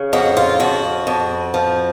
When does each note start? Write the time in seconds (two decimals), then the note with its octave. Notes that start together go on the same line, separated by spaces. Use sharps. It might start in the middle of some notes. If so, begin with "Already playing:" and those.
Already playing: C#3
0.13 F2 F#4
0.37 F4
0.60 F2 F#4
1.07 F2
1.54 F3